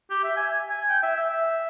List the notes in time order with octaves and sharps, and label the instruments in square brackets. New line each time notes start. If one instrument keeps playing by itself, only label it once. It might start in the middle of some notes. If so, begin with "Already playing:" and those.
[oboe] G4
E5
G#5
G#5
G5
E5
E5